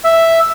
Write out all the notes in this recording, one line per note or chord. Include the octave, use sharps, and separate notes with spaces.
E5